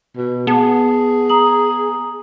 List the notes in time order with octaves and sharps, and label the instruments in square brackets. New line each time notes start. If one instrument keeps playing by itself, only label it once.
[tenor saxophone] B2
[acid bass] B3 [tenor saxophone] G#4 [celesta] A5
[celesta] A#5 D#6 F#7